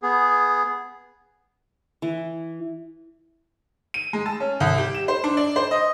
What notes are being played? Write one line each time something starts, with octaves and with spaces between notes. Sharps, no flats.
B3 G#4
E3
D#7
G#3
A5
C#4
C2
G4
E7
C5
D4
D5
C5
D#5